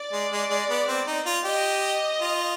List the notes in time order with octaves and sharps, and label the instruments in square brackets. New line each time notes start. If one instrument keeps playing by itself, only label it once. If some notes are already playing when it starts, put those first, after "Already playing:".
Already playing: [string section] D5
[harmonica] G#3
G#3
G#3
B3
C4
D#4
F4
[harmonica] G4 [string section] D#5
[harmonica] F4